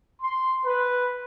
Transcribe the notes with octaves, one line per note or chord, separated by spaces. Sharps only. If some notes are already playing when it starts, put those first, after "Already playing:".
C6
B4